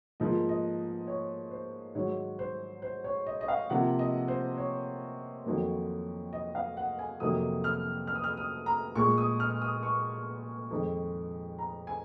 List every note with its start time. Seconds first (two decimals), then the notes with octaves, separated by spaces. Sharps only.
0.20 G#2 F3 A#3 D#5
0.49 D#5
1.07 C#5
1.51 C5
1.95 G#2 D#3 F#3 C#5
2.39 C5
2.82 C5
3.04 C#5
3.27 D#5
3.41 D#5
3.48 F5
3.70 C3 F3 A#3 F#5
3.99 D#5
4.28 C5
4.58 C#5
5.45 F2 D#3 F#3 A#3
6.33 D#5
6.55 F5
6.77 F#5
6.99 G#5
7.20 F2 C3 D#3 F#3 A#3 D#6
7.64 F6
8.07 F6
8.15 D#6
8.24 F6
8.37 D#6
8.66 A#5
8.95 A#2 G#3 C#6
9.18 D#6
9.40 F6
9.61 D#6
9.83 C#6
10.71 F2 D#3 G#3
11.59 A#5
11.87 G#5